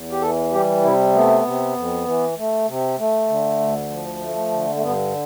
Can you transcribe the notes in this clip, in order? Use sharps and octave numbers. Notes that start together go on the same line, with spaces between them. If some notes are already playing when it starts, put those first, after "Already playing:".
Already playing: E2
G4
E3 A4
G3 G4
C3 E4
A3 B3
C3
F2
E3
A3
C3
A3
D3
D2
F3
A3
D3
A3
G2 B3